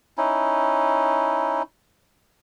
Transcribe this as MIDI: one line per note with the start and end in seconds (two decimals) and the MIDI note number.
0.18 1.62 61
0.18 1.62 63
0.18 1.62 64